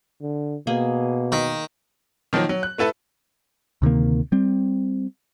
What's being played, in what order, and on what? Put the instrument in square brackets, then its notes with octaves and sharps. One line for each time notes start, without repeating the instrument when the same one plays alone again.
[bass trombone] D3
[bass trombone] B2 [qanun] A#3 G#4
[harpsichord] D#3
[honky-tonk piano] D#3 F3 F#3 A#3
F#3
F#6
A3 E4 A4 B4
[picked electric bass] D2 C3 D#3 A#3
G3 C4